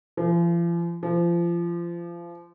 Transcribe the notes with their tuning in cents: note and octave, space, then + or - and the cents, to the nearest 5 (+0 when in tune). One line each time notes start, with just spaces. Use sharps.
F3 -45
F3 -30